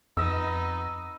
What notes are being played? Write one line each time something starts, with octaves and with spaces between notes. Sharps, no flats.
F2 B3 D#4 D#5 E6